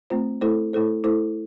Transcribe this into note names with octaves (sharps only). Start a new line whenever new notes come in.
A3 C4 F4 C5
A3 E4 A4 C5
A3 E4 A4 C5
A3 E4 A4 C5